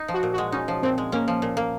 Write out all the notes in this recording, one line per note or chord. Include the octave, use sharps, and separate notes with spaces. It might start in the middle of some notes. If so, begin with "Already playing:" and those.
Already playing: D#4
F3
F#4
A#2
F#4
G#3
C#4 D#4
F3
A#2 C4
G#3
A#3 C#4
F3
A#2
A#3